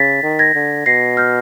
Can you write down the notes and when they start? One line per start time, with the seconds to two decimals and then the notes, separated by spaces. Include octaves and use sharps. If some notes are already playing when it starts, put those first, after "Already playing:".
Already playing: C#3 A6 B6
0.23 D#3
0.39 G#6 A#6
0.55 D3
0.86 B2 A#6 C7
1.17 F6 G6